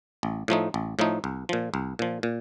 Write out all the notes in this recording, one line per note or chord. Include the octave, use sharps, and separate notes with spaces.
A1
A2 F3 A3 D#4
A1
A2 F3 A3 D#4
C2
A#2 F3
C2
A#2 F3
A#2